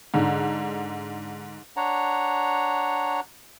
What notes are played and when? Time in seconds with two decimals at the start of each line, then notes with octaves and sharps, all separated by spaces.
0.14 G#2 D3
1.77 D4 C#5 F#5 A#5